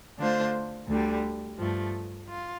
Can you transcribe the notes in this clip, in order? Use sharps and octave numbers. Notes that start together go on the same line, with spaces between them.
D3 A3 D4 F4 C5
D2 D3 G3
G2 F3 A3
F4